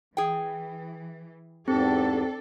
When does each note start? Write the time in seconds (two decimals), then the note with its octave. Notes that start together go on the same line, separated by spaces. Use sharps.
0.17 E3 G#4 G5
1.68 E2 G#2 C4 D4 G4 A4